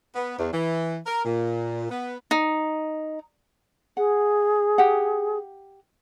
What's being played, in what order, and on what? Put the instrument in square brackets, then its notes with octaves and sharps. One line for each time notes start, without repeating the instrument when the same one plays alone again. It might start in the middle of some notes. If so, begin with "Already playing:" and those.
[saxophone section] B3
E2
E3
A#4
A#2
B3
[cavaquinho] D#4
[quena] G#4 [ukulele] F#5
[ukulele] G4 F#5